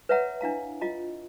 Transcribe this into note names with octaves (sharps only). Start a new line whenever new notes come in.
B4 C#5 E5 F#5 A#5
D4 E4 F5 A#5
F4 D#5 A#5